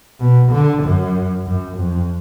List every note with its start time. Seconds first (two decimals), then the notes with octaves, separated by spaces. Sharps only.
0.20 B2
0.52 D3
0.83 F#2
1.45 F#2
1.77 F2